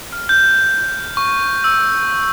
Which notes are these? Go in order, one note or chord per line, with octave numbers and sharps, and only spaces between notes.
F6
G6
C#6
E6